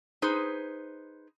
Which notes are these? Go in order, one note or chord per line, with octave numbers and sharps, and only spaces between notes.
D#4 G#4 B4 C5